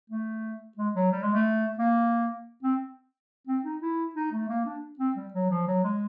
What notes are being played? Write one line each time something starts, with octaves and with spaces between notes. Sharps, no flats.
A3
G#3
F#3
G3
G#3
A3
A#3
C4
C4
D#4
E4
D#4
A3
A#3
D4
C4
G3
F#3
F3
F#3
G#3